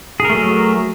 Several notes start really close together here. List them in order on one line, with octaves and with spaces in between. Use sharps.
G#4 A#4 A3 F#3